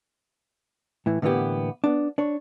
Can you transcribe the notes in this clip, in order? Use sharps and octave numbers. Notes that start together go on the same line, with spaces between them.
A2 E3
A2 D3 E3 A#3 B3 G4
B3 D4
D4 C#5